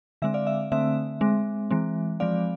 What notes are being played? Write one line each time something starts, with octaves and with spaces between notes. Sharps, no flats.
D3 G#3 C4 E5
D5 F5
E5
D3 A3 C4 E5
G#3 C4
E3 G#3 C4
F3 G#3 C4 D5 F5